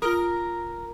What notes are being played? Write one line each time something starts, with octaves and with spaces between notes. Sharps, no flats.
F4 A#4 D#6